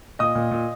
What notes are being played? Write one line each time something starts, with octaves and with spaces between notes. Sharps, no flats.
A#2 D#5 D#6
A#2
A#2